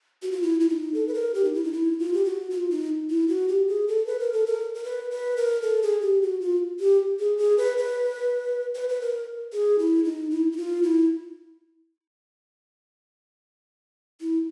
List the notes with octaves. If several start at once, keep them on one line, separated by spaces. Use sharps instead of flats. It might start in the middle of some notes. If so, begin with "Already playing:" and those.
F#4
F4
E4
E4
D#4
A4
B4
A#4
G4
D#4
E4
D#4
E4
F4
G4
F#4
F4
D#4
E4
F#4
G4
G#4
A4
B4
A#4
A4
A#4
A#4
B4
B4
A#4
A4
G#4
G4
F#4
F4
G4
G#4
G#4
B4
B4
B4
B4
A#4
G#4
E4
D#4
E4
E4
F4
E4
E4